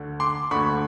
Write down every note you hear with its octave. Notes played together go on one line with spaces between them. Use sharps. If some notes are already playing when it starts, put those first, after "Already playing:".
Already playing: D2 D3
C6 D6
D2 D3 B5 C#6